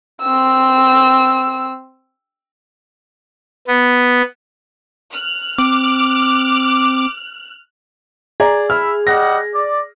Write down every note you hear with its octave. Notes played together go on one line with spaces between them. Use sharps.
C4 E6
B3
F6 F#6
C4 D6
G#4 D5 A#5
E4 E5 F6
G3 D#5 F#5 A#6
D5